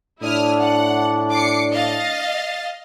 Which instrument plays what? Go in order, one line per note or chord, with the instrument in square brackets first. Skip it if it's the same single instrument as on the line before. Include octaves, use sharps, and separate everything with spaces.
[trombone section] A2 D4 [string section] E4 D#6 F6
[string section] F#5
D6 C7 C#7
D#5 F5 A6